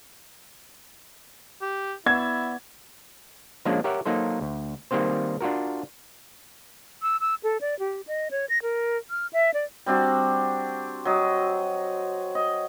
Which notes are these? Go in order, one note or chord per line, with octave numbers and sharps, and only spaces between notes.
G4
B3 E4 D5 G#6
F3 G#3 A#3 C#4 D4
G4 A#4 C#5 E5 F#5
F#3 A#3 D#4 A4 C5
D2
D#3 G3 A#3 C4 C5
D4 F4 F#4 A#4
E6
E6
A4
D5
G4
D#5
C#5
A#6
A#4
F6
E5
D5
G3 C4 D4 F#4
F#3 D#5
D#5